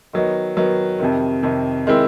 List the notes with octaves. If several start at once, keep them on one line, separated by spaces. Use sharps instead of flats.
D#3 F#3 B3 D#4
D#3 F#3 B3 D#4
F2 C3 D#3
F2 C3 D#3
D#3 G#3 C4 E4